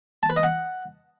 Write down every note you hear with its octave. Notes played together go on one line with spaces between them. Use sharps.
A5
B4
D#5
F#5